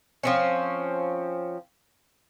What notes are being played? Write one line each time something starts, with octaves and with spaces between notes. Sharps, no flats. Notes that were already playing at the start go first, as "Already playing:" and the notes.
F3 C4 C#4